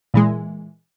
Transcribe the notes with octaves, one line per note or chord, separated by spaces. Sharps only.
A#2 E3 G#3